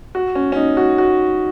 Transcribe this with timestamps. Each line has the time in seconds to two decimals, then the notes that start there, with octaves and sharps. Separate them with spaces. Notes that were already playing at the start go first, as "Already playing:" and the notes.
0.15 F#4
0.35 C#4
0.52 C#4
0.56 D#4
0.77 F#4
0.98 F#4